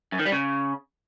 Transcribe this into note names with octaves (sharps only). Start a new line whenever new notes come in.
F#2
D#3
G3
C#3